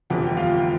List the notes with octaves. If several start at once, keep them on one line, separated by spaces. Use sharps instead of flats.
G1 F2 E3 G4 G5
G5
F4 F5
G5